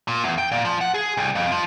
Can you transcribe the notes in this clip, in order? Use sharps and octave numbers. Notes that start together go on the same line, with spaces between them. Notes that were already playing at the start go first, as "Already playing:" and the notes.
A#2
E2
G5
A#2
F3
F#5
G#4
C2
F2
F3